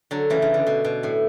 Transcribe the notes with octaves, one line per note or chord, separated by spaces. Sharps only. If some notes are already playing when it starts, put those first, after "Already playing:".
D3 F#3
C#3 E3
C#3
D3
B2
B2
A2